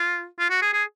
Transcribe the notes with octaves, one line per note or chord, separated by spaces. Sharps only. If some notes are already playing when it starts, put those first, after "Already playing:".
Already playing: F4
F4
F#4
G#4
G#4